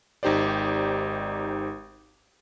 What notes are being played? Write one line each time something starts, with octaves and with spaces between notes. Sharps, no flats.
G#1 D#4 G4 C5 D5